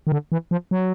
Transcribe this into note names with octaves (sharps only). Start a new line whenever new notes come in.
D#3
D3
E3
F3
F#3